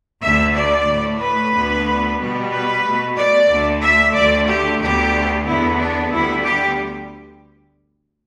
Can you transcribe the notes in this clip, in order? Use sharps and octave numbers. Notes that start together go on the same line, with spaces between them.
D2 D3 A3 E5
D5
A2 A3
B4
D2 D3 B3
B2 G3 B3
B4
B2 A3
D5
D2 D3 A3
E5
D2 D3 A3 D5
G4
D2 D3 B3 G4
E2 D3 B3 E4
D4
D2 D3 G3 B3 E4
G4